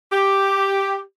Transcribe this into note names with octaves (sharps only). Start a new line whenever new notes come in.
G4